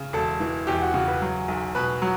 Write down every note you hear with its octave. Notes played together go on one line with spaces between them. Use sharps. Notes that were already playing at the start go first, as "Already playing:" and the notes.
Already playing: C#3
E1 A4
E3
E2 G4
F#4
C#3 F#4
B4
F#3
B1
B2 B4
F#3